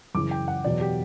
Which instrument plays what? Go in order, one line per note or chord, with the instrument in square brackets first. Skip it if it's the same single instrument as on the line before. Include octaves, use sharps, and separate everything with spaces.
[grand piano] F#2 C#3 E3 D6
G5
F#5
E2 B2 F#3 D5
G4